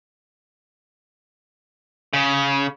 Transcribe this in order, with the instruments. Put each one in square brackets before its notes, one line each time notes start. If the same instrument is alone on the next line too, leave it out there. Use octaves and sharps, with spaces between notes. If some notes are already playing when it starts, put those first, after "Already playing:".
[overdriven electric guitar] C#3